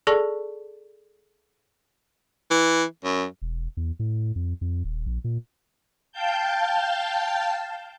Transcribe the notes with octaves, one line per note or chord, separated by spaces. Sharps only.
G#4 A4 D5 A5 C#6
E3
F#2
E1
E2
A2
F2
F2
D#1
A#1
A#2
F5 G5 A5 G6